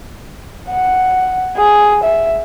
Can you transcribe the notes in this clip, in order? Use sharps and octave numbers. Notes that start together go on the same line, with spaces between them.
F#5
G#4
E5